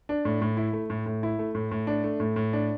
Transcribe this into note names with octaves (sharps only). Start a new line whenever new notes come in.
D4
A2
A2
E4
A3
A2
A2
E4
A3
A2
A2
D4
A3
A2
A2
D4